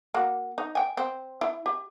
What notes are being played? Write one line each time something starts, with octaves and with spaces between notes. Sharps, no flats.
A#3 F#4
D#4
G5 G#5
C4
E4
G4